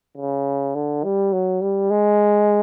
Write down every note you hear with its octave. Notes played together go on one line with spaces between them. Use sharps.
C#3
D3
G3
F#3
G3
G#3